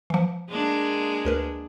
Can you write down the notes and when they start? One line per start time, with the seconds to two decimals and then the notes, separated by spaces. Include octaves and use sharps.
0.10 E3 F3
0.49 G#3 A#3 D4
1.25 D2 A#4 B4